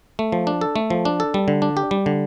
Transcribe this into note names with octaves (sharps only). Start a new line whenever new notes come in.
A3
F3
D4
A4
A3
F3
D4
A4
G3
D3
D4
G4
G3
D3